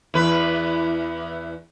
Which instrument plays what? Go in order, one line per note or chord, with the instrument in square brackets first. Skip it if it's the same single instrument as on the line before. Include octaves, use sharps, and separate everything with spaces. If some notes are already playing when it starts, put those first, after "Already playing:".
[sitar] E2 B4